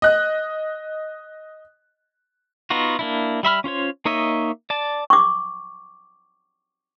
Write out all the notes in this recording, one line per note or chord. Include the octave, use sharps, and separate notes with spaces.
D#5 F#6
B3 D#4 F4 F#4
A#3 D4 E4
G3 E5 B5 F6
C#4 F4 C5 C#5
A#3 D#4 C#5 D#5 E5
D5 A5
C#6 D6